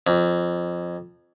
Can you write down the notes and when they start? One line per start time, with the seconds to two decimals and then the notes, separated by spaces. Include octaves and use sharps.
0.07 F2